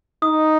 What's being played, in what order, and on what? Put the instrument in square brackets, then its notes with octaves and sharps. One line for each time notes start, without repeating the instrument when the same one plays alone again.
[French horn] D#4 [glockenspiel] D#6